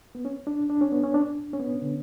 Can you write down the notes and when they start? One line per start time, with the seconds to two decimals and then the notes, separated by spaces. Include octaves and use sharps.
0.15 B3
0.25 C#4
0.47 D4
0.70 D4
0.81 C#4
0.92 B3
1.04 C#4
1.14 D4
1.53 C#4
1.60 B3
1.82 D3